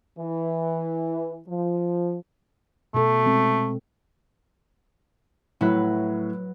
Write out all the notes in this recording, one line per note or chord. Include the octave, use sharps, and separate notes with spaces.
E3
F3
B2 A3 A4
G#3 C4
A2 F#3 E4 B4